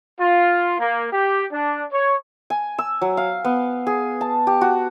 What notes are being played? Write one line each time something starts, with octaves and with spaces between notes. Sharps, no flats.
F4
A#3
G4
D4
C#5
G#5
E6
F#3
F5
B3
G#4
A5
G4
F#4